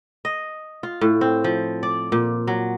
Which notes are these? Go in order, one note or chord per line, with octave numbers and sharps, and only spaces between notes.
D#5
F4
A2
C4
F3
D5
A#2
F#3